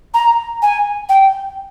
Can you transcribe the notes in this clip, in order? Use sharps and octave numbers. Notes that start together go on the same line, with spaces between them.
A#5
G#5
G5